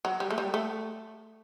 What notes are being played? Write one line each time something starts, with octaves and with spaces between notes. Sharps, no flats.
F#3
G3
A3
G3
A3